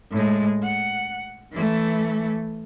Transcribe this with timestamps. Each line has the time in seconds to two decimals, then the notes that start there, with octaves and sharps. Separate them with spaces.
0.11 A2 G#3
0.63 F#5
1.52 E3 A3